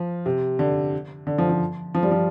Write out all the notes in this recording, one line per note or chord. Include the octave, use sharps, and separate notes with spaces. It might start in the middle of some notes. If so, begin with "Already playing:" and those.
Already playing: F3
C3
D3
D3
F3
F3
F3
G3
F3